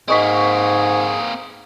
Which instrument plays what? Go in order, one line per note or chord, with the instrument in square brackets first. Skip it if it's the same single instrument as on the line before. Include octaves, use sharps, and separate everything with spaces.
[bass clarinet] G#2 [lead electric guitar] A#3 C4 [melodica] G#4 [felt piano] D#5 C#6 B6